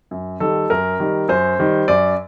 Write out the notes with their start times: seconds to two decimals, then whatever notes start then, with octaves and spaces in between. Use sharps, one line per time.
0.11 F#2
0.40 D#3 G3 A4
0.70 F#2 A#4
1.00 D#3 G3
1.29 F#2 C5
1.59 D#3 G3
1.88 F#2 D5